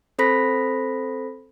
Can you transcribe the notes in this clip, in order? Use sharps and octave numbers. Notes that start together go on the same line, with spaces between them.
C4 A4 C5 B5 A#6 B6